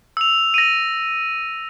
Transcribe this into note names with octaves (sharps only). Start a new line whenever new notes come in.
E6 F7
A#6 D#7